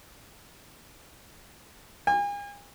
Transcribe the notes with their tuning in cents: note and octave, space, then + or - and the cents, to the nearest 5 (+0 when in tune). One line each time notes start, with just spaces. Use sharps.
G#5 -40